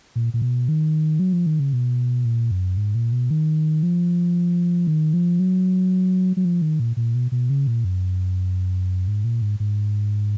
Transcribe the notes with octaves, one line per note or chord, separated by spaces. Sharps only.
A#2
A#2
B2
D#3
F#3
F3
D#3
C#3
B2
A#2
F#2
G#2
A#2
B2
D#3
F3
D#3
F3
F#3
F#3
F3
D#3
A#2
A#2
B2
B2
C#3
A#2
F#2
G#2
A#2
G#2
G#2